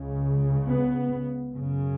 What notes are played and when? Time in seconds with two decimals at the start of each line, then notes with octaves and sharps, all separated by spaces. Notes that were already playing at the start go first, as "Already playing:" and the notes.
Already playing: C#2 C#3
0.68 B3
1.51 F#2 C#3